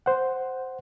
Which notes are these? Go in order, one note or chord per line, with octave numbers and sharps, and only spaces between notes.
C5 F#5